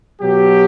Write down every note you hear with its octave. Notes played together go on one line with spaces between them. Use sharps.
B2 F#3 G4